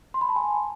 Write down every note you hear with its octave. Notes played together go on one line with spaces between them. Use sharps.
C6
B5
A5
G#5